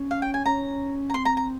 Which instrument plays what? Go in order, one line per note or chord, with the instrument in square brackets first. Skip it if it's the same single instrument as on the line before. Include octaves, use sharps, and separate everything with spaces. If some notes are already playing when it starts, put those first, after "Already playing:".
Already playing: [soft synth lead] C#4
[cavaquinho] F5
G5
G#5
[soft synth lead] C#4 [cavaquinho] A#5
[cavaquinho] A#5
[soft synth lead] C4 [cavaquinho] C6
[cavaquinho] A#5
A#5